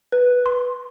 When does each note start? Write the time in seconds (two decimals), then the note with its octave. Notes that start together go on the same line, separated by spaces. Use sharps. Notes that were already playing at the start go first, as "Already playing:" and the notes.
0.12 B4
0.46 C6